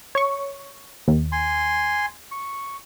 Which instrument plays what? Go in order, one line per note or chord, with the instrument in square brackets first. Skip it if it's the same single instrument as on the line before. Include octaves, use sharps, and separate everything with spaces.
[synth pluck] C#5 C#6
D#2
[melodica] G#5 C6
C#6